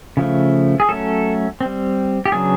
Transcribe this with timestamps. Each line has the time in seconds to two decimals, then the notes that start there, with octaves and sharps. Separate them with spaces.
0.17 C#3 F3 A3
0.80 G#4
0.89 F#3 A3 C#4 A4
1.61 G3 C4
2.26 G4
2.32 C#3 F#3 B3 D4 G#4